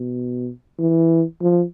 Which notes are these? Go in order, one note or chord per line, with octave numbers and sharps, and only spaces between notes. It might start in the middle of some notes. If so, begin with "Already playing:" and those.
Already playing: B2
E3
F3